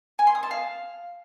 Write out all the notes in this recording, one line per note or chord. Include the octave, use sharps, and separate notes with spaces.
G#5
C6
D#6
A5
F5